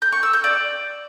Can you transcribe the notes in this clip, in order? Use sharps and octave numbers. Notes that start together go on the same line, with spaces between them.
G6
C#6
E6
G6
D5